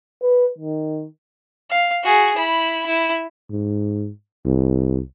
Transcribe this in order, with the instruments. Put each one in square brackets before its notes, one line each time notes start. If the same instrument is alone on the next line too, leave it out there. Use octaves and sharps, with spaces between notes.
[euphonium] B4
D#3
[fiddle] F5
F#4 G#4
E4 B5
E4
[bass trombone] G#2
C2